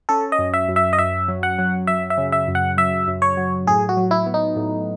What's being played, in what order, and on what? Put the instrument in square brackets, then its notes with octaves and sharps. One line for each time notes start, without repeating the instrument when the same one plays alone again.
[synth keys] C#4 [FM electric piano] A4
[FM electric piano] D#5
[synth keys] F#2
[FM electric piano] E5
[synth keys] F#2
[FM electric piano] E5
D#5
[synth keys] F#2 [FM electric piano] E5
[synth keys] F#3
[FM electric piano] F#5
[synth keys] F#3
[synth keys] F#3 [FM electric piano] E5
[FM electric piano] E5
[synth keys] C#3
[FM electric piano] E5
[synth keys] F#2
[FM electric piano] F#5
[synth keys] F#3 [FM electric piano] E5
[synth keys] F#2
[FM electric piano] C#5
[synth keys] F#3
[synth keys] A2 [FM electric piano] G#4
[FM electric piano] F#4
[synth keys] F#3
[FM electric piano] E4
[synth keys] B3
[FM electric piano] D#4
[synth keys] A2